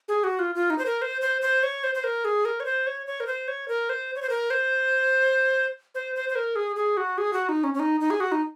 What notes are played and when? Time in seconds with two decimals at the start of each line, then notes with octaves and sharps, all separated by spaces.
0.08 G#4
0.24 F#4
0.39 F4
0.55 F4
0.70 D#4
0.79 C5
0.86 A#4
1.02 C5
1.22 C5
1.42 C5
1.63 C#5
1.84 C5
1.95 C5
2.04 A#4
2.25 G#4
2.45 A#4
2.60 C#5
2.66 C5
2.87 C#5
3.07 C#5
3.20 A#4
3.27 C5
3.48 C#5
3.68 A#4
3.89 C5
4.16 C#5
4.22 C5
4.30 A#4
4.50 C5
5.95 C5
6.16 C5
6.29 C5
6.35 A#4
6.56 G#4
6.76 G#4
6.97 F#4
7.18 G#4
7.33 F#4
7.49 D#4
7.64 C#4
7.74 C#4
7.80 D#4
8.00 D#4
8.10 G#4
8.20 F#4
8.32 D#4